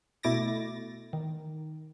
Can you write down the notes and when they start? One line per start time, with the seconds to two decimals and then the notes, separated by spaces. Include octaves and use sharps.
0.23 B2 A3 E4 D6 A6 A#6
1.13 D#3